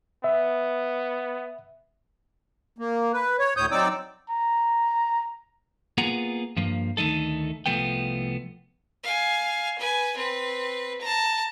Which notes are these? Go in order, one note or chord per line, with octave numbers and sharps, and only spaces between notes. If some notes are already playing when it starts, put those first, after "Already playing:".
B3 E5
A#3
B4
C#5
D2 A2 C#5 D#6 G6
F#3 C4 D#4 D5 D6 E6
A#5
A#3 B3 F4 G#4 F#5 A#5
G2 F3 A#3
D2 D#3 A3 D#4 A4
C2 A#2 F3 A3 B3 G5
F5 G#5
B4 G#5
C4 B4
A5 A#5